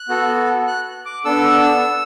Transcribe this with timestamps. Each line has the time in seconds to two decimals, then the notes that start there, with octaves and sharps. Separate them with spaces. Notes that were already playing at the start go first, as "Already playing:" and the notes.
Already playing: F#6
0.09 B3 F#4 A4
0.67 F#6
1.06 D6
1.25 B3 D4 A4 E6